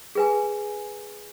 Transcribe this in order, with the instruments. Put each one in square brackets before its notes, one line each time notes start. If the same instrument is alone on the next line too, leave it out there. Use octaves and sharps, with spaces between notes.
[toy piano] G#4 B4 G#5